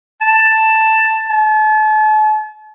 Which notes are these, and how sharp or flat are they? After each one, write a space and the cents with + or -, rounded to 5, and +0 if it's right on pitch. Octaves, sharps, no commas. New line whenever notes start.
A5 +5
A5 -40